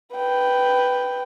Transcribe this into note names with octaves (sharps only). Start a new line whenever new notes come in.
B4 G5